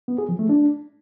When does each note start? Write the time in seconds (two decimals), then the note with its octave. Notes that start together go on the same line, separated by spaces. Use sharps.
0.08 B3
0.18 G#4
0.29 F3
0.39 A3
0.49 D4